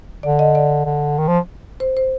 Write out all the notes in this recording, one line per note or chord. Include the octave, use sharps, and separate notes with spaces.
D3 D5
D#5
D5
D3
D#3
F3
C5
C5